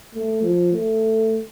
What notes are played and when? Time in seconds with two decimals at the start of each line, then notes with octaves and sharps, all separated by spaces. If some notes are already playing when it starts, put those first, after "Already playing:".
0.15 A3
0.43 F3
0.73 A3